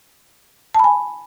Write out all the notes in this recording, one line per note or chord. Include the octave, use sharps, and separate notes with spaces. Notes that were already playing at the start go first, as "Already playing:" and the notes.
G#5 A5 B5